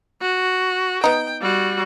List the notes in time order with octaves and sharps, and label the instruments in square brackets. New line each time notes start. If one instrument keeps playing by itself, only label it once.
[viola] F#4
[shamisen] B3 D#4 [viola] G5
[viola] G3 F#4